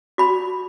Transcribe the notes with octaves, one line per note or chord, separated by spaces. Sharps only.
F#4 B5